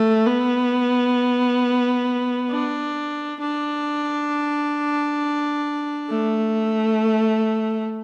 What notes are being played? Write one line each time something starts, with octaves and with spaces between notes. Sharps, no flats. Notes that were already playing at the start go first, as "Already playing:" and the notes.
Already playing: A3
B3
D4
D4
A3